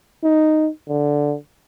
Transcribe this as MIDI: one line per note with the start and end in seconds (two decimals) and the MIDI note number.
0.23 0.69 63
0.88 1.35 50